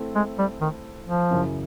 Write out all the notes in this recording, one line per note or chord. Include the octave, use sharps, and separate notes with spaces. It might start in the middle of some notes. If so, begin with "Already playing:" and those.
Already playing: A3 C4 E4 A4
G#3
G3
D#3
F3
F#2 C#3 E3